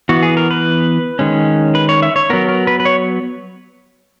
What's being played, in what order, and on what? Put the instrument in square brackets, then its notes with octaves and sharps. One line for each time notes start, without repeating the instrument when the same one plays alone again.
[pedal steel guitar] E3 B3 F#4
G#4
A#4
B4
D#3 G#3 C#4
B4
C#5
E5
C#5
F#3 B3 A#4
A#4
B4
B4
C#5